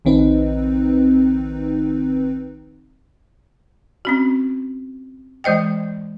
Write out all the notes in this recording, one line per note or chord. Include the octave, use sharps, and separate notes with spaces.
A#1 D#3 C4 D#4 B4
C4 C#4 F#4
E3 G#3 C5 D#5 G5